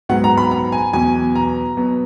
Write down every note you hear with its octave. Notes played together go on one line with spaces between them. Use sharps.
G#2 F#3 B3 F#5
A#5
B5
A#5
G#5
E2 B2 F#3 B3 G#5
A#5
B2 F#3 B3